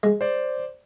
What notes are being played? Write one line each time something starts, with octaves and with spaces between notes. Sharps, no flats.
G#3
C5 D5